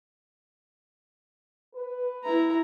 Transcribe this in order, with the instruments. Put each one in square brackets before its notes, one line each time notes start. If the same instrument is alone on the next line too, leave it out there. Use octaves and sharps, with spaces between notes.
[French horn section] B4
[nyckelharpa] E4 A#5